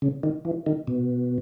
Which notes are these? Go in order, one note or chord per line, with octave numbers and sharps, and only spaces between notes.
C#3
D#3
E3
D#3
B2